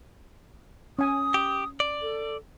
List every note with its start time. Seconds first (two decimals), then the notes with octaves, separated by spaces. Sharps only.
0.99 C#4 G#5 D#6
1.34 G4
1.80 D5
2.02 A4